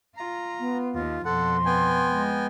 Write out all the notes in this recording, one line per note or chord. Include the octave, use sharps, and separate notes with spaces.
F4 A#5
B3
D#2 F4
F2 B2 A4 F#5 C6
B3 G5 G#5
G#3